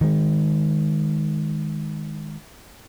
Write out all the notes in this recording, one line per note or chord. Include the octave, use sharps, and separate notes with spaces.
D#3 G#3